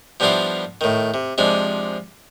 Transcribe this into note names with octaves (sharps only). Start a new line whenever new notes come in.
F3 G3 B3 D4 E4 F4
A2 D#3
C3
C3 F3 G#3 D4